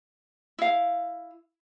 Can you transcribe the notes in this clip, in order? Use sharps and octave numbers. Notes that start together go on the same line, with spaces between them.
E4 F5